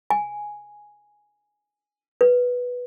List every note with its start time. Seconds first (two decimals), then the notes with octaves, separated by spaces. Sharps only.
0.10 G#5
2.21 B4